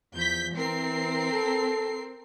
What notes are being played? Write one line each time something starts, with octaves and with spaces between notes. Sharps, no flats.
E2 F3 G6 B6
E3 C4 A#4 C7
A4